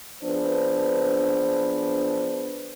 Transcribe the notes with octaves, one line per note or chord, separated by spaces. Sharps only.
F3 B3 D4 G#4 B4 C5